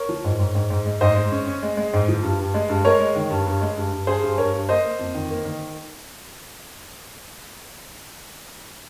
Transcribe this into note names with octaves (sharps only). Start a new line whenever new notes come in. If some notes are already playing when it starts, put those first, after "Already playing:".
Already playing: A#4 C#5
F3
G#2
G#2
G#2
G#2
G#3
G#2 C5 D#5
G#3
C#4
C#4
G#3
G#3
G#2
F3
G2
G2
G#3
G2
G#3 A#4 C#5
G#3
D#3
G2
G2
G#3
G2
G2
G2 G#4 C5
G2
G2 A#4 C#5
G2
A#3 C5 D#5
A#3
F2
D#3
A#3
D#3